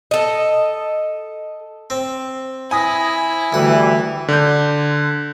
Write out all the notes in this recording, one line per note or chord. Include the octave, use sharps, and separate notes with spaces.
A4 D#5
C4
E4 G#5 D#6 A#6
D2 E3 G3 F#5
D3 G6